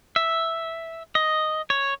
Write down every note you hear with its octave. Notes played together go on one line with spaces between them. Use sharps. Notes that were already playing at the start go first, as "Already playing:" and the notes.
E5
D#5
C#5